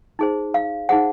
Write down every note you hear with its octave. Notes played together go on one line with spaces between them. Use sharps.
D#4 G#4 C5
F5
D#4 G#4 C5 F#5